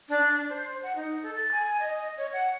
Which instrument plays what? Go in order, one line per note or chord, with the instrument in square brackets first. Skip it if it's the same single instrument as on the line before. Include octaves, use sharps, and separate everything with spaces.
[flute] D4
C5
F#5
D#4
A4
A6
G#5
D#5
C#5
F#5